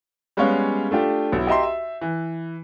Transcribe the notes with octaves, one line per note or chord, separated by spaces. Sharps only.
G3 G#3 B3 C#4 C#5 F5
A3 D4 F4 G4
B1 E4
G4 D#5 E5 A#5 C6
E5
E3